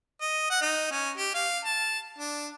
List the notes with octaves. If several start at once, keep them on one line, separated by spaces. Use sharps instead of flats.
D#5
F#5
D#4
C#4
G4
F5
A5
D4